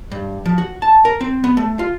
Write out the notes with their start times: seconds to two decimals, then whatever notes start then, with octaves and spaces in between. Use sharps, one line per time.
0.12 G2
0.45 F3
0.58 F#4
0.82 A5
1.05 A#4
1.21 C4
1.44 B3
1.57 A3
1.79 F4